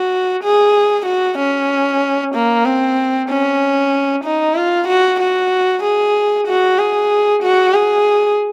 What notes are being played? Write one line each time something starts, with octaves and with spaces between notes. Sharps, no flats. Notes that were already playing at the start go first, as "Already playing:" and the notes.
Already playing: F#4
G#4
F#4
C#4
A#3
C4
C#4
D#4
F4
F#4
F#4
G#4
F#4
G#4
F#4
G#4